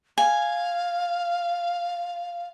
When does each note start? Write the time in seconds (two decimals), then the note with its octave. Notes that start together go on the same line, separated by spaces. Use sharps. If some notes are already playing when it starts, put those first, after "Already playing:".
0.18 F5 G#5